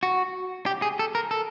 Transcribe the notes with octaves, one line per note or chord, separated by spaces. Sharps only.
F#4
G4
G#4
A4
A#4
A4